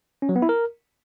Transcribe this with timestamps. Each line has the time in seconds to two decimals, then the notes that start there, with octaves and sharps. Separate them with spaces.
0.22 C#4
0.29 F#3
0.36 B3
0.42 E4
0.49 A#4